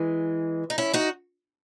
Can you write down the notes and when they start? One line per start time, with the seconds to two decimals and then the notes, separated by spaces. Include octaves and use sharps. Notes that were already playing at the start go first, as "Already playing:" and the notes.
Already playing: E3 G#3
0.70 D#4
0.78 C#4 E4
0.93 D#4 F#4